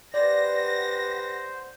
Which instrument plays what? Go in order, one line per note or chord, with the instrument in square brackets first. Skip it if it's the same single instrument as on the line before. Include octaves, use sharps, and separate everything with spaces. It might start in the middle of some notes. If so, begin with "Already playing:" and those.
[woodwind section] G4 B4 F#5 [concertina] C5 [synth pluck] D5 [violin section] A#6